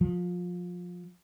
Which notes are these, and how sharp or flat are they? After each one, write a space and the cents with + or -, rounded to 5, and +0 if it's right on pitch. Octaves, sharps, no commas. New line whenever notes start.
F3 +25